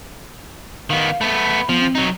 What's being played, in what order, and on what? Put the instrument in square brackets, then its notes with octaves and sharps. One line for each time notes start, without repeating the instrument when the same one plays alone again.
[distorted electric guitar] D#3 B3 [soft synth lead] F5
[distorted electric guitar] A3 B3 [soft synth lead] B5
[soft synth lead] B5
[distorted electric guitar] F3 [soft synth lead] B3
[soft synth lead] C4
[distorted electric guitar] F#3 D#4